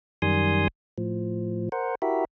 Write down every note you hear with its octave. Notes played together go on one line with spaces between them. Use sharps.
F#2 D#3 G3 G#5 C6 D#6
A2 F3
A#4 C5 F#5
E4 F#4 G4 A#4 E5